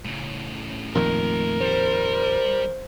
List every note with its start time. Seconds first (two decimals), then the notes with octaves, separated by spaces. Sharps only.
0.05 A2 C#3
0.95 F2 A#2 D#3 A3 A#4 C6
1.60 G3 C5